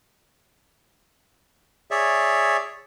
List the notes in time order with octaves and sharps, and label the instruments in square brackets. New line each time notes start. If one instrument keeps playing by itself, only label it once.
[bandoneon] G#4 C#5 D5 E5